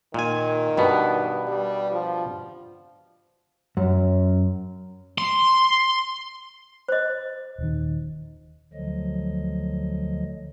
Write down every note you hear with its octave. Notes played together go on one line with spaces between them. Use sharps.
A#2 D#3 G#5
G2 B2 B3
G3
F3
F#2
C6
C5 D#5
D#1 D#3
D2 D3 F3 F#3 D#5